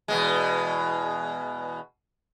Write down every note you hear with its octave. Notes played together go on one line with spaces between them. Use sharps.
E2 B2 G#3